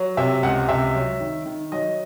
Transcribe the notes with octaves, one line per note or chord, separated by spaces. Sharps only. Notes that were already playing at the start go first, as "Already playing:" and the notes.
Already playing: F#3
C3 E5
C#2 F#5
C3 E5
F#3
D#3
D#3
F#3 D#5